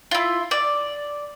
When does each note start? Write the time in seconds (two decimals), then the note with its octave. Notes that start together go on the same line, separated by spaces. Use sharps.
0.11 E4 F4
0.51 D5